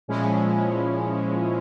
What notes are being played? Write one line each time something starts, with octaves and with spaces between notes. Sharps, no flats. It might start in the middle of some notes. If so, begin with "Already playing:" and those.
A#2 F3 G#3 C#4 E4